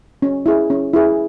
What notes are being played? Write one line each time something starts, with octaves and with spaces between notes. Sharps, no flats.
C#4
E4 G#4
C#4
E4 G#4